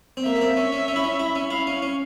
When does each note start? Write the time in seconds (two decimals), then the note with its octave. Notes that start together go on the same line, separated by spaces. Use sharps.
0.17 C4
0.25 A#3 E5
0.36 A#3
0.42 C4
0.57 C#4
0.73 C#4
0.88 C#4
0.96 E4
1.04 C#4
1.20 E4
1.35 C#4
1.50 E4 F5
1.67 C#4
1.82 C#4